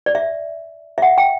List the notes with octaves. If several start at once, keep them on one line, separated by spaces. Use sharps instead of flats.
D5
E5
E5
F#5
G5